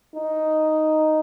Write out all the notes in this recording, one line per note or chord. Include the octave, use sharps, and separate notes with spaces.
D#4